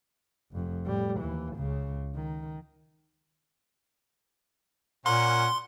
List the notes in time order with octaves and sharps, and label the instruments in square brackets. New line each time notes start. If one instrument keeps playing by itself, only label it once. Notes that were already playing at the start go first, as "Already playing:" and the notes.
[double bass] F1 F2
A2 G3
D#2 E3
C#2 C#3
D#3
[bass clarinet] A#2 [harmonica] A#3 C#4 F#5 [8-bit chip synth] C6